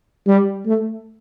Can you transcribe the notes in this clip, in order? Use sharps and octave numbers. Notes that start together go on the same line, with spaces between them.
G3
A3